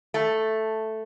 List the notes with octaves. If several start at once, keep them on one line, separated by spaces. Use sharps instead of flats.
A3